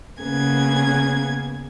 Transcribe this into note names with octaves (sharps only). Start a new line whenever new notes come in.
C#3 A#3 B3 G#4 G#6